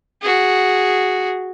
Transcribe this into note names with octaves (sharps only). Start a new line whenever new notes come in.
F#4 G#4